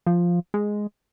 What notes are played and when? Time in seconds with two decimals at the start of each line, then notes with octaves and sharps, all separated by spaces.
0.07 F3
0.54 G#3